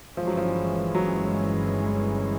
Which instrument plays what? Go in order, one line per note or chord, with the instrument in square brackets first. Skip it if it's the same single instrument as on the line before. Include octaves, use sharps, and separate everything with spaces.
[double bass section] G1 G2 E3 G#3 C#4 [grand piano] F3
[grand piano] F#3
F3
F#3